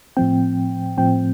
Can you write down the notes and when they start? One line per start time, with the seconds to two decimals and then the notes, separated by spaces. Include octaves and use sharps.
0.17 A2 F3 C4 G5
0.97 A2 F3 C4 G5